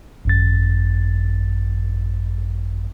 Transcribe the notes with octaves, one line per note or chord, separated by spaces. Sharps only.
G#1 F#2 A6